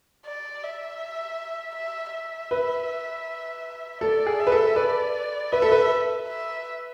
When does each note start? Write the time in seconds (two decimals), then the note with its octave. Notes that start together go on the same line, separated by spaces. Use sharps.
0.25 D5
0.63 E5
1.75 E5
2.13 E5
2.51 B4
4.01 A4 D5
4.27 G#4
4.39 E5
4.47 B4
4.52 A4
4.76 B4 D5
5.51 B4 E5
5.62 A4
5.72 B4
6.28 E5